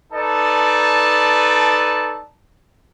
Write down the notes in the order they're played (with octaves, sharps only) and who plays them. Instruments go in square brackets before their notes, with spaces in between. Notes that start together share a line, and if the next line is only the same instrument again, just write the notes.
[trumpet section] D#4 A4 B4 D5 A5